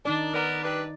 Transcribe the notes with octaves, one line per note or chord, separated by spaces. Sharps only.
D#3 D4 D#4 D5
B3 A#4 B4 D5
G2 D4 B4